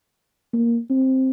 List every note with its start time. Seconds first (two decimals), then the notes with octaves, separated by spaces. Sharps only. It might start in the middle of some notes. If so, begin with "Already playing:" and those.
0.53 A#3
0.90 C4